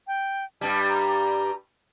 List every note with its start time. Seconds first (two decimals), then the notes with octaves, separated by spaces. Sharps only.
0.07 G5
0.61 G2 G3 A5
0.89 A#5